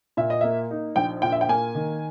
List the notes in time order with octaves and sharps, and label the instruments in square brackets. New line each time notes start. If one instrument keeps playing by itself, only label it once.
[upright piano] A#2 E5
D#5
A#3 E5
D#4
A#1 G5
A#2 G5
E5
G5
A#3 G#5
D#3